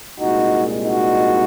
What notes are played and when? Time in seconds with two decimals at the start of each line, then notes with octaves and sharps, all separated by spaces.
0.20 C2 A#2 G#3 D#4 F#4
0.84 D#4 F#4